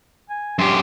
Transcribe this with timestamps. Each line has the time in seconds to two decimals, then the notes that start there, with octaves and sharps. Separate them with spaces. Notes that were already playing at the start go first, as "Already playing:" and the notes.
0.30 G#5
0.59 F#2 G4 C6